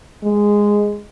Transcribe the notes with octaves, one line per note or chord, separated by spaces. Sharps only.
G#3